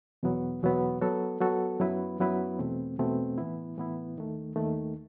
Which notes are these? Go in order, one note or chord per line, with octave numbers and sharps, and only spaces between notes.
E2 B2 F#3 B3
E2 B2 F#3 B3
F#3 B3 F#4 A4
F#3 B3 F#4 A4
F#2 F#3 B3 E4 B4
F#2 F#3 B3 E4 B4
E2 B2 A3 C4
E2 B2 A3 C4
A2 E3 B3 E4
A2 E3 B3 E4
D#2 D#3 A3
D#2 D#3 A3